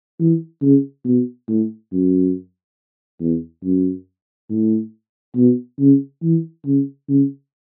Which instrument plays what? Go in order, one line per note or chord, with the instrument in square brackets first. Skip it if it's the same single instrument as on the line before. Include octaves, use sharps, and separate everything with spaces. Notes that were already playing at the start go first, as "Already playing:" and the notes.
[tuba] E3
C#3
B2
A2
F#2
E2
F#2
A2
B2
C#3
E3
C#3
C#3